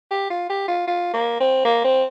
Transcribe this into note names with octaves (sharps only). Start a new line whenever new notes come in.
G4
F4
G4
F4
F4
A#3
C4
A#3
C4